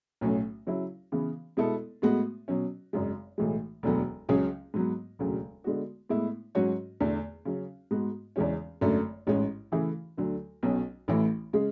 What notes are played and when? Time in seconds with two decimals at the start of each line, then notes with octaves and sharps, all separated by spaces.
0.21 B1 A2 F#3 C#4
0.66 C#3 F#3 C#4 E4
1.12 C#3 E3 B3
1.57 B2 G#3 B3 E4 A4
2.02 A2 G#3 B3 F#4
2.48 B2 F#3 C#4
2.93 G#1 F#2 C#3 G#3
3.38 B1 A2 E3 G#3
3.83 E1 D2 D3 F#3 B3
4.29 C#2 C#3 F#3 C#4 G#4
4.74 G#2 F#3 B3
5.19 E1 D2 C#3 F#3
5.64 D3 G#3 B3 F#4
6.09 A2 G#3 B3 E4
6.55 G#2 F#3 C#4 F#4 C#5
7.00 E2 D3 A3
7.45 C#3 F#3 C#4
7.91 G#2 G#3 B3 F#4
8.36 E2 C#3 E3 G#3 C#4
8.81 G#1 F#2 D3 A3
9.27 A1 G#2 G#3 C#4
9.72 C#3 E3 A3 E4 G#4
10.17 D2 D3 F#3 A3
10.63 B1 B2 F#3 C#4
11.08 A1 A2 E3 A3
11.53 C#3 G#3